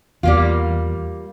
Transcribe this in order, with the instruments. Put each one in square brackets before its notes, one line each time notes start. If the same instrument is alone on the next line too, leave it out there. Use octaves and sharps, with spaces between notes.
[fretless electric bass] E2 [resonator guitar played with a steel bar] G3 A#3 F4